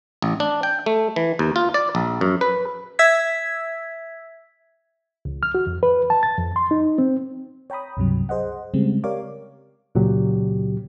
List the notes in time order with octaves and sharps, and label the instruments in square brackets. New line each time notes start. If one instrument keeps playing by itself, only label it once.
[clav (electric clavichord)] A1
D4
G5
A3
E3
D#2
F4
D5
A#1
F#2
B4
[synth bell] E5 E6 G#6 B6
[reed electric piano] C#2
F6
F#4
F2
B4
A5
A6
F2
C6
D#4
C4
[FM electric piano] C#5 G5 A#5 B5 D#6
C#2 G2 C3 F#3
G#4 C5 D#5 F#5
C#3 G3 G#3 C4
G4 A#4 C#5 D5 F5 D6
[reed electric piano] C#2 A#2 C#3 F#3 G4